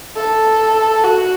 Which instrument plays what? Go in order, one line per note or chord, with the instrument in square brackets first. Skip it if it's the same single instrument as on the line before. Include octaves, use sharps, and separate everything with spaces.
[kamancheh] A4
F#4